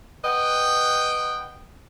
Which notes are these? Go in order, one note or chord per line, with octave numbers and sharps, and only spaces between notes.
B4 D#5 F#5 G5